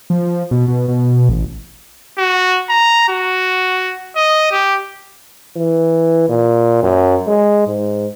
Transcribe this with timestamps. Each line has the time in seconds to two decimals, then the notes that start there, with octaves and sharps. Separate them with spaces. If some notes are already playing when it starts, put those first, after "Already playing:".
0.10 F3
0.51 B2
0.68 B2
0.88 B2
1.29 A1
2.18 F#4
2.69 A#5
3.09 F#4
4.16 D#5
4.52 G4
5.57 E3
6.29 A#2
6.83 F#2
7.27 G#3
7.67 G#2